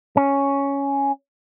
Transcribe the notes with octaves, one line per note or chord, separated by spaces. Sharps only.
C#4